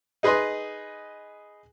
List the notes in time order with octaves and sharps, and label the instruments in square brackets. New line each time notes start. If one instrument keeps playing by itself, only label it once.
[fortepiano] D#4 G#4 B4 D#5 C6